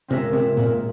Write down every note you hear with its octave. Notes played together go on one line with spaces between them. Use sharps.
C3 G#3 C4 F4 A#4 E5
C3
A#2